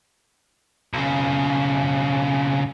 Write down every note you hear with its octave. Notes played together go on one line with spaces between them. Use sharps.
B1 C#3